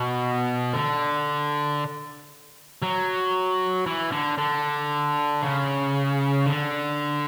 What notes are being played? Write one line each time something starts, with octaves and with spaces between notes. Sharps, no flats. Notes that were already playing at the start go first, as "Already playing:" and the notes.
Already playing: B2
D3
F#3
E3
D3
D3
C#3
D3